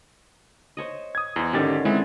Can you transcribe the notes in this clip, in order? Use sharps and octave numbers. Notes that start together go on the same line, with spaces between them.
C5 C#5 D#5
D#6 G#6
E2 C5 D#5
G#1 D3 D#3 C#4 G4 A6
G#3 C4 E4 G#4